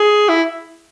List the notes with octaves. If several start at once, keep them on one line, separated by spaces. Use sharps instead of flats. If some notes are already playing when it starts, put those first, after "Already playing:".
Already playing: G#4
E4